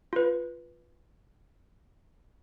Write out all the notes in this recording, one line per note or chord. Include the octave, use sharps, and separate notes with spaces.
F4 B4